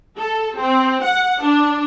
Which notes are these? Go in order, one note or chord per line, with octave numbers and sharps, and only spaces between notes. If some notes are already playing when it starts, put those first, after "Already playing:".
A4
C4
F#5
D4